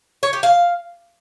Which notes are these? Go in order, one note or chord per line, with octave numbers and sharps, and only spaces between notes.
C#5
G4
F5